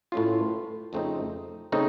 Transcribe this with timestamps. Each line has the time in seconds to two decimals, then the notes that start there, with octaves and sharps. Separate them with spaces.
0.12 A2 A3 C#4 F4
0.93 F2 C#3 A3 C4 D#4
1.72 C#3 A3 C4 D#4